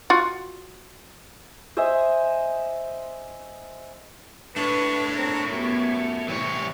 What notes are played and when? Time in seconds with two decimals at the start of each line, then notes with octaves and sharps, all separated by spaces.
0.10 F4 F#4
1.77 C5 D#5 E5 G#5
4.56 A3 D4 B4 C#5
5.15 C4 A#4
5.52 F#2 B3 G4
6.28 A2 C3 E3 G3 C#5